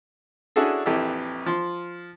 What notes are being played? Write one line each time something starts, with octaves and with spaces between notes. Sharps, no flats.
C#4 D4 E4 F#4 G#4 A4
A#1 F2 E3 G4 A4 E6
F3 C6